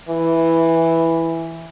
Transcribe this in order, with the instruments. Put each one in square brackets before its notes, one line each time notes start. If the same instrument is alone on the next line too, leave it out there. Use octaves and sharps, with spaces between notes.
[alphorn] E3